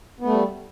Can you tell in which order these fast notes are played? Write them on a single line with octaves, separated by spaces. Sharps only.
B3 A3 G3